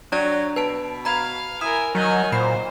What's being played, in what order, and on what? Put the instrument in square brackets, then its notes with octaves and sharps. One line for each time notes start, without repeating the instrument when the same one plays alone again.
[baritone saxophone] F#3 [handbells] D4 D5
[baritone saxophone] B2 [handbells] B4 A5 D7
[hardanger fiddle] F5 [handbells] A#5 B5 G#6
[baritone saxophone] E4 [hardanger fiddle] A#4 G#5 [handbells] D#6
[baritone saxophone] D#3 [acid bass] F#3 [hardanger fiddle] D#5 G#5
[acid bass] A#2 [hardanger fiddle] C5 [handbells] B5 C7